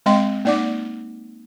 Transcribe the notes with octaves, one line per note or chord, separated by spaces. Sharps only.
G#3 C4 D#5 G5 C6
A#3 D#4 D5 F#5 D6